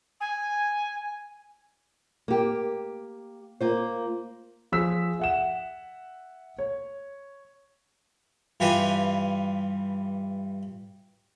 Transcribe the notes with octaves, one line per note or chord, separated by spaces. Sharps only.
G#5
A#3 G4
A#3 F4 C5
F3 G#4 E6 B6
E5 F#5 E7
C#5
G2 E3 F4 G4 B4 G#5